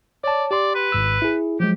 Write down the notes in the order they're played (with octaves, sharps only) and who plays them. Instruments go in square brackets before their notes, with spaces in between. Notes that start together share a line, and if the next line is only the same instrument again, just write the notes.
[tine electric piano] C#5 A5 [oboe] D5
[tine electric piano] G4 C6 [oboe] D5
[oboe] B4
[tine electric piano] G#1 G#2 E6
E4 G#4
[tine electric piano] F3 F#3 G#3 [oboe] G4